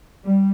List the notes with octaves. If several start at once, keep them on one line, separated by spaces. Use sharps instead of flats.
G3